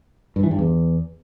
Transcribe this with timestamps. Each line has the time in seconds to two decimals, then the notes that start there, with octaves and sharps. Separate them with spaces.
0.36 G2
0.43 E3
0.51 G2
0.59 E2